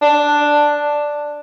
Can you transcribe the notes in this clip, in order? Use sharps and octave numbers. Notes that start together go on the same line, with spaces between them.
D4